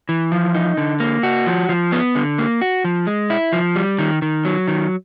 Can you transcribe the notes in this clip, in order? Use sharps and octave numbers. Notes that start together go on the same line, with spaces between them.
E3
F3
D#4
D3
A#3
F#4
F3
F3
B3
D3
A#3
F#4
F3
G#3
E4
F3
G3
D#3
D#3
F#3
D#3